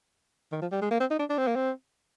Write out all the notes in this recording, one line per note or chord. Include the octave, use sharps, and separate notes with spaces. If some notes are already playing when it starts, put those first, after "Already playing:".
D#3
F3
G3
G#3
A#3
C4
D#4
D4
D4
C4
A#3
C4